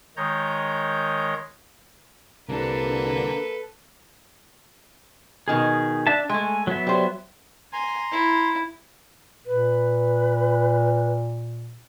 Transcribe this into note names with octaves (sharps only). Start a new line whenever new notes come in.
D#3 G#3 C#5 A#5 G6
C2 D3 A#3 D4 A4 B4
B2 D#3 G#4 G#5
D4 E5 A5
G#3 A3 G#5
F#3 B3 E5
G3 C5
G#5 A#5 C6
E4
A#2 B4